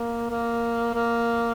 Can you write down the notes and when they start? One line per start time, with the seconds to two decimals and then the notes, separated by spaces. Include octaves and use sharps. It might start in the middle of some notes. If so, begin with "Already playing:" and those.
Already playing: A#3
0.30 A#3
0.94 A#3